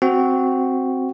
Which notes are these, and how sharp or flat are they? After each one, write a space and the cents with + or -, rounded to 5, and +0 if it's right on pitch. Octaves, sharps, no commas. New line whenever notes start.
C4 +0 F#4 +0